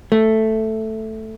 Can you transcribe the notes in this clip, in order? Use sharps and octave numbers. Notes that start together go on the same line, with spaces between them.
A3